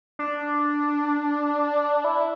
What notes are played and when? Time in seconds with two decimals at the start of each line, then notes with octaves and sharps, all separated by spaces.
0.19 D4
2.04 E4